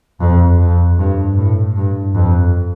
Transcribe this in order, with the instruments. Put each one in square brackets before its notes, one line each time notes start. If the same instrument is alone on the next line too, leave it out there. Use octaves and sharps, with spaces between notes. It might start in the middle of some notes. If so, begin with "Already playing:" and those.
[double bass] F2
F2
G2
A2
G2
F2